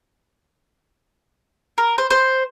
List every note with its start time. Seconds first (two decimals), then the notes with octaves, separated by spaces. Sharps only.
1.78 A#4
1.98 C5
2.10 C5